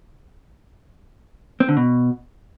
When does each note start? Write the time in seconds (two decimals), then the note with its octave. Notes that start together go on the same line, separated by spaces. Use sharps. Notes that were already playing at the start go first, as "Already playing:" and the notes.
1.60 C4
1.69 D3
1.77 B2